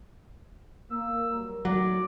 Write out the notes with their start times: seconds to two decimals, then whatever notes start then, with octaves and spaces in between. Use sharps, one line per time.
0.91 A#3 E6
1.29 F#3 G3 A#4
1.65 D#2 A2 F#3 D5